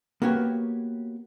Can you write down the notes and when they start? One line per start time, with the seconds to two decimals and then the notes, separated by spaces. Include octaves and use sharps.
0.22 A#3 B3 F#4 G4 C#5